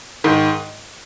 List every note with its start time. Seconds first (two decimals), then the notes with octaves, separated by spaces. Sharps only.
0.24 G#2 D#3